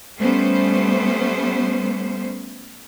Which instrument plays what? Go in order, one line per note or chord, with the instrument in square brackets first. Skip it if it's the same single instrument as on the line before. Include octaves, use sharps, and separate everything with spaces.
[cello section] G3 A3 B3 C#4 C5